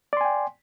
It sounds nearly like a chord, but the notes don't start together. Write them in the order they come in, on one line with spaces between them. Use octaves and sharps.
D5 C6 G#5 G5